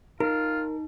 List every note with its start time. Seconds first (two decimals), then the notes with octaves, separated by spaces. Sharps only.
0.20 D#4 F4 A#4